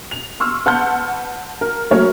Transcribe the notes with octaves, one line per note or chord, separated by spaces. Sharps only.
F7
C6 C#6 E6 F6
B4 F#5 A5 C6 F6 G6
A#4
F#3 A3 A#3 A#4 C#5